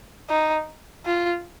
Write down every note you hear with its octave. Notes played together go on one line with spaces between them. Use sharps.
D#4
F4